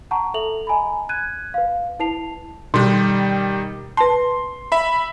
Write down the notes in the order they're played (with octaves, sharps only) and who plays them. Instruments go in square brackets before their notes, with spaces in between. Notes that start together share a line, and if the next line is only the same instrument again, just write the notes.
[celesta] F#5 A5 A#5 C#6
A4 E5 F7 F#7
D#5 G#5 A#5 B5
F#6 G#6 D#7
B4 F5
E4 B4 A5 C7 F7
[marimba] B2 G4 [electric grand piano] D#3 G3
[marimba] B4 A5 [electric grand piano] C6
[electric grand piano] E5 B5